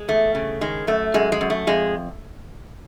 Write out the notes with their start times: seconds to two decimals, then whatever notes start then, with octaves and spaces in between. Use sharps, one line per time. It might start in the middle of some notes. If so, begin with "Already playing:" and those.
Already playing: G#3
0.08 E2 A3
0.35 C#3
0.61 D#3 G#3
0.87 F#2 A3
1.14 F#2 G#3
1.32 G#3
1.41 F#2
1.50 A3
1.67 F2 G#3